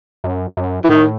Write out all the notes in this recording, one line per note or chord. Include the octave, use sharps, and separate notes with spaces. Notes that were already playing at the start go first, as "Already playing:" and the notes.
F#2
F#2
E3
A2 D#3